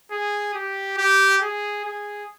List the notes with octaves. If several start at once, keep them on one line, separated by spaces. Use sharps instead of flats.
G#4
G4
G4
G#4
G#4